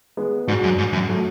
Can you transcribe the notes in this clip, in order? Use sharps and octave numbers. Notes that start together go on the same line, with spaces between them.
G#3 B3
G#2 D4 F#4
F#2
G#2
F#2
F#3 A3